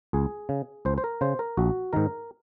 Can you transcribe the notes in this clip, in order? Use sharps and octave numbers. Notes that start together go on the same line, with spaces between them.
C#2 G#4
C#3
C#2 C5
C5
A#4
C#3 C5
A#4
A#1 F#4
G#2 D#3 A#4